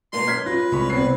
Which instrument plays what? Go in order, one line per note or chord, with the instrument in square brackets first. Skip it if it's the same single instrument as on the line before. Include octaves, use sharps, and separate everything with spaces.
[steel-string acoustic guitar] G#2 B2 A#3 [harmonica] C6
[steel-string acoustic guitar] F#2 [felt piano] F6 G#6 B6
[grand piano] F4 [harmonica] B4 [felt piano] A#6
[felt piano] C2 B5 [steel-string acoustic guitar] G#3 C#5
[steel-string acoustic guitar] E2 C3 [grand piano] B3 C4 C7